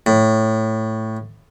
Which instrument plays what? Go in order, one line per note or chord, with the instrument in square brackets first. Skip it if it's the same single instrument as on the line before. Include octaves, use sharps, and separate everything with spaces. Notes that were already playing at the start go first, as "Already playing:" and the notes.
[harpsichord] A2